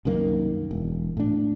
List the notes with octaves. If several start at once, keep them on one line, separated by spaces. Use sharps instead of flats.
C2 F#2 D#3 A#3
E1
A2 D4